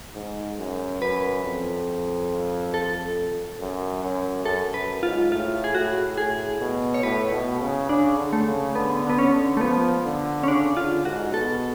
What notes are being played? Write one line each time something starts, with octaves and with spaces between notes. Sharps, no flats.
G#2
F#2
F#2 B4
F2
A4
F#2
F#2
F#2 A4
F#2 B4
G#2 F4
A2 F4
G#4
A2 F#4
A2 G#4
B2
C#5
A2 B4
B2
C#3
C#3 D4
D3
A3
C#3
D3 B3
D3 B3
C#4
D3
A3
F3 B3
D3
C#4
C#3 D4
D3 F4
G#2 F#4
B2 A4